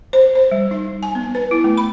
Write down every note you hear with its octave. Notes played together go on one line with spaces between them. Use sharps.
C5
C5
G3
D#4
G#5
B3
B4
E4
A3
B5